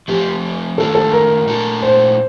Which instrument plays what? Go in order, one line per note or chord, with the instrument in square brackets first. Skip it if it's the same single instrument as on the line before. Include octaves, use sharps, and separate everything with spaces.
[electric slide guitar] F3 A3 C4 [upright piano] G4
[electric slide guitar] D#3 A3 D4 F4 [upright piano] A4
[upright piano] A4
A#4
[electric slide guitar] A#2 A3 D4 A4
[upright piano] C5